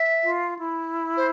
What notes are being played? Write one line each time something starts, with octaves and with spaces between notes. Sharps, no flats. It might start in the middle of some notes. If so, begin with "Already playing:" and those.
Already playing: E5
F4
E4
C5